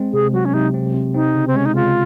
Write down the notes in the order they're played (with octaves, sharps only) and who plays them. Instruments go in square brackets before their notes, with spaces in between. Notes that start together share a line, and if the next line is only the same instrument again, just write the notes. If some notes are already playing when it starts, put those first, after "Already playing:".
Already playing: [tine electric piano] G#3 C4
[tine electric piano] C3 [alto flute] G#4
[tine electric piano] F#3 [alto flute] F#4
[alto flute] C#4
[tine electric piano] C3 [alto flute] D#4
[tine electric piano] C4
C3
[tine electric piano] C4 [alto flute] D#4
[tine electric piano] C#3
[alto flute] C4
[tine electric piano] G#3 [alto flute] C#4
[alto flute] D#4
[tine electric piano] C#3 [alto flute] F4